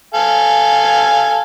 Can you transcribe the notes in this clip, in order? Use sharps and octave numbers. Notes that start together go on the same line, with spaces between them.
A4 F5 G#5